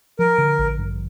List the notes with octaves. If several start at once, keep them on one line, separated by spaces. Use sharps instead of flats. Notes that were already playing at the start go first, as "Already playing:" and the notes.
F3 A#4
D3
A1
G2